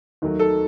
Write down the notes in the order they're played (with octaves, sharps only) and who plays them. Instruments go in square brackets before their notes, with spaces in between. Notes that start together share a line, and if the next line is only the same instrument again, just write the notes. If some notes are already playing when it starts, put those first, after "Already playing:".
[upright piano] D#2 D#3 F#3 A3
A4